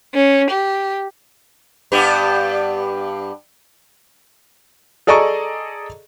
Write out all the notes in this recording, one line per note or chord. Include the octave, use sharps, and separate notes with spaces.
C#4
G4
G2 B3 G4
G#4 A4 D5 D#5 A#5 C#6